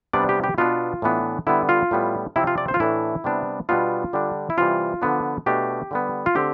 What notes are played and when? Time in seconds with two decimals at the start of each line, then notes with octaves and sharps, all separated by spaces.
0.13 C3 G3 B3 D4 D5
0.29 G4
0.44 G4
0.58 B2 B3 D4 F4
1.02 A2 E3 B3 D4
1.47 D3 G3 B3 E4
1.69 F4
1.91 A2 G3 B3
2.36 C3 F3 C4 E4
2.47 F4
2.58 D5
2.68 C5
2.74 F4
2.80 A2 E3 A3 D4 E4
3.24 C3 G3 B3 D4
3.69 B2 G3 B3 D4 F4
4.13 D3 G3 D4
4.50 E4
4.58 C3 E3 G3 F4
5.02 D3 F3 B3 D4
5.46 B2 A3 D4 G4
5.91 D3 G3 B3
6.26 F4
6.35 D3 A3 C4 G4